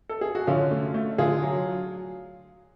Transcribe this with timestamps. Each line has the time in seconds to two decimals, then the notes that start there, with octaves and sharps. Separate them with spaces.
0.09 A4
0.21 G#4
0.35 F#4
0.47 D3 C#4 F4
0.71 A3
0.94 A3
1.18 D3 F4 G#4
1.42 F#3